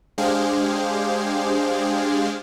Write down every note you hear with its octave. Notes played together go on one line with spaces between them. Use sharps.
G#3 D4 G4 G#4 C5 F5